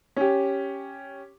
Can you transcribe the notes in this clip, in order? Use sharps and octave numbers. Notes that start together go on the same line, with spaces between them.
C#4 G4